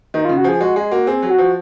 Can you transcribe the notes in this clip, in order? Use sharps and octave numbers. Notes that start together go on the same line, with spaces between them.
D#3 D#4
C#3 F4
F#4
F3 G#4
G#3 F#4
G#3 G#4
A#3 F#4
C4 G#4
F#3
F#4
F3